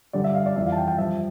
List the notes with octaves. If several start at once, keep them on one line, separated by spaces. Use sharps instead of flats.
G2 D3 G3 D5
E5
F5
D5
F2 E3 G3 E5
F5
A5
G5
G5
G2 F3 E5